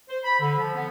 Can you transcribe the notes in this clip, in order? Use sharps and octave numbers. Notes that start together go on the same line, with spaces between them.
C5
B5
D3
F3
B3